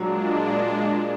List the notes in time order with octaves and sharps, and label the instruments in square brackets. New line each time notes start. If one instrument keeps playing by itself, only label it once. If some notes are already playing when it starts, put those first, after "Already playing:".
Already playing: [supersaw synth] A#2 G#3 D4 [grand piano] F#3